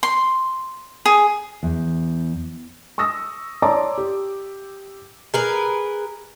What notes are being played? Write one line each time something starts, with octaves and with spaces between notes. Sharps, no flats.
C6
G#4
E2
C#6 D#6 E6 A#6
C#5 D5 A5 A#5 C6 D6
G4
G#4 A#4 B4